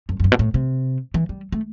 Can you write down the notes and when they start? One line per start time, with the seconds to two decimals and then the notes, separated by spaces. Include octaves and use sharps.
0.09 F#2
0.20 F#2
0.24 G2
0.32 B2
0.39 A2
0.54 C3
1.14 E3
1.29 G3
1.52 A3